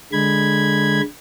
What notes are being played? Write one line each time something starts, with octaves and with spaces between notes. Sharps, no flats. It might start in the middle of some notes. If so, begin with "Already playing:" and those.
D3 G#3 B5 G#6